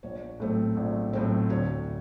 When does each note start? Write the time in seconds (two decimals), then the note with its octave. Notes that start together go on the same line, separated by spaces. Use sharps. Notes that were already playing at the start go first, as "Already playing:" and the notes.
0.03 A#1 C#5
0.40 A2 F#3 A3 C4
0.77 A#1
1.13 A2 F#3 A3 C4
1.50 D2 C#5